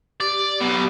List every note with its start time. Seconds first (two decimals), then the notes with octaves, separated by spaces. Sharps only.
0.21 G4 D5
0.61 B1 B2